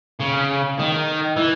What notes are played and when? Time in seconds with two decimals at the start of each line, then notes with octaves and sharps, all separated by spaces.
0.20 C#3
0.79 D#3
1.37 E3